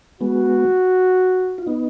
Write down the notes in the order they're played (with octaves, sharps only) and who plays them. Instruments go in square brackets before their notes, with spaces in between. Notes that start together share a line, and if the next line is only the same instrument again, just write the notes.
[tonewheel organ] G#3 B3 [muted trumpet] F#4
[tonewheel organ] F4
B3 D#4